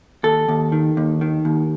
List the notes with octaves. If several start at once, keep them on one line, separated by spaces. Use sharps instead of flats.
D#2 A4
D#2
D#3
D#2
D#3
D#2